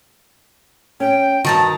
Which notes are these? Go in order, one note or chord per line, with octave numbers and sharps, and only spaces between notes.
C#4 G5
G2 D#3 F#4 A5 A#5